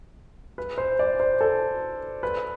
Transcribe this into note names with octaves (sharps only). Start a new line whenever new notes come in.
B4
C5
D5
C5
A4
B4